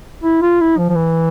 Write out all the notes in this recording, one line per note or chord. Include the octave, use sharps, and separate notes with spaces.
E4
F4
E4
F3
F3
E3